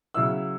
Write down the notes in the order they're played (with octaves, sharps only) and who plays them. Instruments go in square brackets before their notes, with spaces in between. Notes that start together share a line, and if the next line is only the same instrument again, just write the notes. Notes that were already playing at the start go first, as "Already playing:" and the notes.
[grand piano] C#3 F#3 C#4 E4 E6